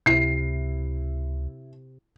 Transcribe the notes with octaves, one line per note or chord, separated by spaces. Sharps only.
C#2 C3 E4 C7